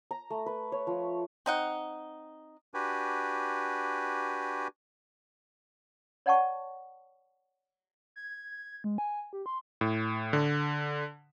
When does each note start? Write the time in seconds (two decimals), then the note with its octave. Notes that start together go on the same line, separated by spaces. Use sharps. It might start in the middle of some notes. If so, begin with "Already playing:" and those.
0.11 A#5
0.30 A3
0.46 B4
0.72 C#5
0.87 F3
1.46 C4 D#4 F#5
2.74 D4 F#4 G4 B4 G#5
6.26 C#5 D5 F#5 G5 A5 C#6
8.16 G#6
8.84 G#3
8.98 G#5
9.33 G4
9.46 C6
9.81 A2
10.33 D3